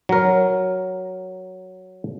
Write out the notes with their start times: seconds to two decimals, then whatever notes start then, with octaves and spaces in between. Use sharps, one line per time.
0.09 F#3 A#4